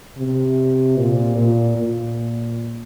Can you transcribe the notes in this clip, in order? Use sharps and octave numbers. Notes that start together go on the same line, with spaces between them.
C3
A#2
A#2
A#2